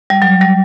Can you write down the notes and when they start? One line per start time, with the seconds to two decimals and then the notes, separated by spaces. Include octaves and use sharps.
0.10 G3
0.22 F#3
0.41 G3